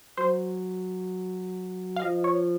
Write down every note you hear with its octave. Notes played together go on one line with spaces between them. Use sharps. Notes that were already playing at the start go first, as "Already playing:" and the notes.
F#3 C5
F5
F3 D#5
C#5